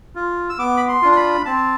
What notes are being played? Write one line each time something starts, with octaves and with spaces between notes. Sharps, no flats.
F4
E6
B3 D6
B5
C6
D4 F4
C6
B5
C4 A5